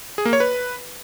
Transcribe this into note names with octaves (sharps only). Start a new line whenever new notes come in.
G#4
A#3
C#5
B4